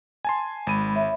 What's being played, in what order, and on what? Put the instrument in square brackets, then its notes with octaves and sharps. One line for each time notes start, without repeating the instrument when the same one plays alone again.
[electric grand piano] G#5 A5 C6
[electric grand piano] G#1 D#7 [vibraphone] G#3 B5
[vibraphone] C#5 E5 B5